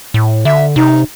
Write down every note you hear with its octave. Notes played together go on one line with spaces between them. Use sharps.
A2
D3 E5
C3 D#4